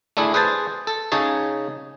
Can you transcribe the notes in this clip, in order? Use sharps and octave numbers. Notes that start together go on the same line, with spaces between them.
A3 D4 E4 G#4
G#4 B4 C5 G#5 A5
A4
C#3 D#4 G#4 C#5 A5